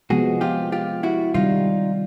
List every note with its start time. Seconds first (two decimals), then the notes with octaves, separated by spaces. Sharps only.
0.10 C3 F3 G#3 B3 F#4 G#4
0.41 F4 G4
0.72 F4 G4
1.03 E4 F#4
1.34 C3 D#3 G3 D#4 F4